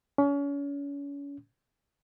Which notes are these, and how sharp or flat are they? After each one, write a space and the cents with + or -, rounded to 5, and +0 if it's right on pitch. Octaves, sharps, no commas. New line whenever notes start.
C#4 +35